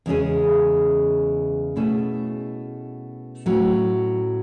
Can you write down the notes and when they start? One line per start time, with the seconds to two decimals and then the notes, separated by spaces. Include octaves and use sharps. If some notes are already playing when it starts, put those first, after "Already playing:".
0.06 E2 C#3 G#3 C#4 G#4
1.76 B2 A3 C#4 E4 G#4
3.46 A2 F#3 C#4